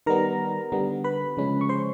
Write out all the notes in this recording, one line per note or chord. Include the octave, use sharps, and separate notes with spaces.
D#3 G3 B3 A#4 A#5
D3 G3 B3
B4 B5
C#3 F3 G#3 C#4
C#6
C5 C6